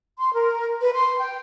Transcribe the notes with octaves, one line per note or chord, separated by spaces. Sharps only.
C6
A#4
B4
C6
G5